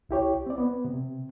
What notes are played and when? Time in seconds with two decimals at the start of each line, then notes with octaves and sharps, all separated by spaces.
0.09 C2 E4 G4 C#5
0.47 C4 D5
0.58 B3
0.85 C3